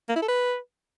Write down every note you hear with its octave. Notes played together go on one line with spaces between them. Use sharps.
A#3
E4
A4
B4